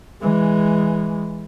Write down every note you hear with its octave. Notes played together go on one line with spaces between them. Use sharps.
E3 G#3